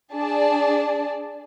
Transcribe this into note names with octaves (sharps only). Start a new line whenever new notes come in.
D4 G#4 D5 A5